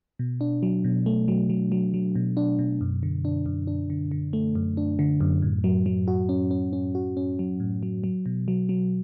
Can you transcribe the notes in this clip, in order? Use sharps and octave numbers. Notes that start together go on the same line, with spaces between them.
B2
D4
F#3
B2
A3
F#3
F#3
F#3
F#3
B2
D4
B2
F#2
D3
D4
F#2
D4
D3
D3
A3
F#2
D4
D3
F#2
A2
F#3
F#3
F#4
C#4
C#4
C#4
F#4
C#4
F#3
A2
F#3
F#3
B2
F#3
F#3